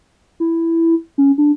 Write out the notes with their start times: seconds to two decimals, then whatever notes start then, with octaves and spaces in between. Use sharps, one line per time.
0.40 E4
1.18 C#4
1.38 D4